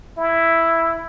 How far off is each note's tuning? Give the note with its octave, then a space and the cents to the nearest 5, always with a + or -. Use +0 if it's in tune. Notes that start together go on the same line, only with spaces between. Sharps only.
E4 +5